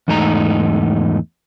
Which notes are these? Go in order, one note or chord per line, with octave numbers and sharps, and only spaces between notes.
E2 G#2 A3 D#4 A#5